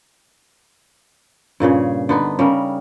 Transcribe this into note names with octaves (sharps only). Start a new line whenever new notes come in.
G2 A#2 C#3 G#4
D3 B3 D#4
C#3 G3 A#4